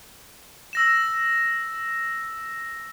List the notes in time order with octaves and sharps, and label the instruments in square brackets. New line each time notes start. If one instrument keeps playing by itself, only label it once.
[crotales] E6 A#6 E7